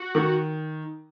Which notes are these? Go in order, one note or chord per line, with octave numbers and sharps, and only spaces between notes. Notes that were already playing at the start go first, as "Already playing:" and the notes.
Already playing: F#4
D#3